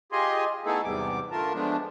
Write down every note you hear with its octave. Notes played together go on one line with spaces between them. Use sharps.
F4 G4 G#4 D#5 G#5 C6
A3 B3 D#4 E4 G#4 A4
E2 G#2 C3 G3 B3 D6
D3 A3 F4 A#4 A5
F3 G#3 A3 B3 D4